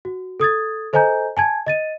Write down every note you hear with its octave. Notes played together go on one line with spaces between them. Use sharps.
F#4
A4 D#6 G#6 A6
A4 C5 D#5 G#5 A#5 G6
G#5 A5 G#6
D#5 A6 D#7